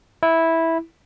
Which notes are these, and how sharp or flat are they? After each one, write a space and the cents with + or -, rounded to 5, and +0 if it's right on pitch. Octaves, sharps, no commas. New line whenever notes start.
E4 -10